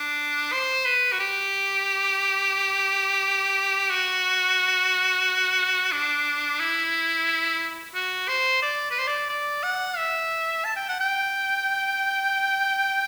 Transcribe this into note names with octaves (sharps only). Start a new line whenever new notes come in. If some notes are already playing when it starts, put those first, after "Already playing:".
Already playing: D4
C5
B4
F#4
G4
F#4
D4
E4
F#4
C5
D5
B4
C5
D5
D5
F#5
E5
A5
G5
F#5
G5